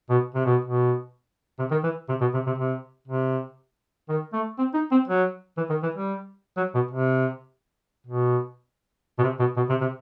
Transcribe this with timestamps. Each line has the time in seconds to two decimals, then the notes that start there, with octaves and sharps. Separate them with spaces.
0.10 B2
0.35 C3
0.45 B2
0.65 B2
1.59 C3
1.71 D#3
1.84 E3
2.09 C3
2.21 B2
2.34 C3
2.47 C3
2.58 C3
3.08 C3
4.09 D#3
4.33 A3
4.58 C4
4.74 D#4
4.91 C4
5.08 F#3
5.57 E3
5.70 D#3
5.83 E3
5.95 G3
6.57 F#3
6.74 B2
6.91 C3
8.07 B2
9.19 B2
9.23 C3
9.40 B2
9.57 B2
9.70 C3
9.81 C3